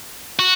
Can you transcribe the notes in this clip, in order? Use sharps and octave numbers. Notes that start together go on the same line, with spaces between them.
F#4